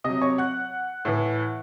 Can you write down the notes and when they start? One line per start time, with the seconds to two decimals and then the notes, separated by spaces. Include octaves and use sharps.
0.04 C3 F#3 D#5 D#6
0.21 C#5 C#6
0.38 F#5 F#6
1.05 A2 E3